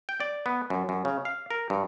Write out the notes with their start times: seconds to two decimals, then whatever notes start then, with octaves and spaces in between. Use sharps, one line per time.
0.09 G5
0.20 D5
0.46 B3
0.70 F#2
0.89 F#2
1.05 C#3
1.25 F5
1.51 A#4
1.70 G2